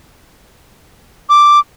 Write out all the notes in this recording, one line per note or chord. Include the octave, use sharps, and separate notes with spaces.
D6